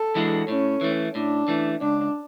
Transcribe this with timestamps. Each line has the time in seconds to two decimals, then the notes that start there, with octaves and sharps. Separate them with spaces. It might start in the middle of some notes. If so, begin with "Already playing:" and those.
Already playing: A4
0.15 E3 G#3 D4 F#4
0.48 A2 C#4
0.81 E3 A3
1.15 A2 D4
1.48 E3 A3
1.81 C#2 D4